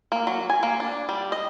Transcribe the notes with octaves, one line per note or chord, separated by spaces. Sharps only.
A#3
F#3
G#5
A#3
D4
G3
D#5